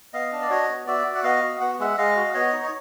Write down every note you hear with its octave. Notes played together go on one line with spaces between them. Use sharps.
B3 D#5 F5
D4
D5
F#4 C#5 D#5
B3
F#4 D5 E5
F#4
F#5
B3 D#5 F5
F#4
B3 F#5
G#3 E5 F#5
G#3 D#5 F5
F#4
B3 C#5 D#5
D#4
C#5